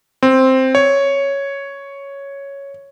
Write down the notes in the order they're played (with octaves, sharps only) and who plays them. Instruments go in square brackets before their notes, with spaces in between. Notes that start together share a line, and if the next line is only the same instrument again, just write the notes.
[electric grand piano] C4
C#5